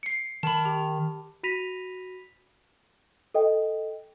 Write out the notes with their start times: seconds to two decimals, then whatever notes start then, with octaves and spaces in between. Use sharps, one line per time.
0.03 C7 C#7
0.43 D#3 A5 B5
0.65 G4
1.43 F#4 B5 A#6 B6 D#7 F7
3.35 A4 D#5 G5